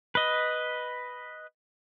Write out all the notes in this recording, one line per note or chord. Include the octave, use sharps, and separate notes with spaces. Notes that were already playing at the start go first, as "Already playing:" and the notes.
B4 D#5